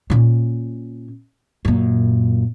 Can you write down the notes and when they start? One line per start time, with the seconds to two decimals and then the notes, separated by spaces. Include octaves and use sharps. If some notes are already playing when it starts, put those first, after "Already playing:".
0.10 A#2 C#4
1.65 F#2 A#2